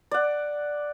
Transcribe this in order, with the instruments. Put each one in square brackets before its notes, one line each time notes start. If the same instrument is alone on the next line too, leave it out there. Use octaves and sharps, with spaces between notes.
[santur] D5 F#5